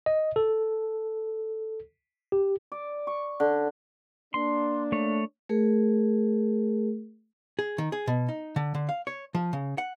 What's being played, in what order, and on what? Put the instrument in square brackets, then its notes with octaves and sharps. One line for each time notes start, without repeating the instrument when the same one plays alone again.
[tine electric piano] D#5
A4
G4
[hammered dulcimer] D5
C#6
D3
[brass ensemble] A#3 D4 [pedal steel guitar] C6
[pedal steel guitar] A3 C#5
[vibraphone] A3 G#4 A#4
[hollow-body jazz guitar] G#4
D#3
G#4
B2
D#4
D3
D3
F5
C#5
F3
C#3
F#5